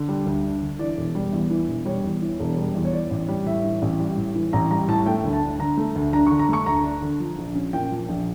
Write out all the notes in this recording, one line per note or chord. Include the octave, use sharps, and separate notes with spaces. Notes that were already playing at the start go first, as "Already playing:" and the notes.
Already playing: D3
G3
D2
D4
D3
E3 D5
E1
G3
E2
E3
E1
G3 C#5
E2
E3
E1
G3
E2
C#5
E3 D5
A1
G3
A2 E5
E3
A1
G3
A2
E3
A1 A#5
G3 A#5
A2 A5
A3 G5
D2
A5
D4
D3 A#5
A3
D2
D4 A#5
C#6
D3
A#5
A3 C#6
D2 A#5
D4
D3
F3
A#1
C#4
A#2 G5
F3
A#1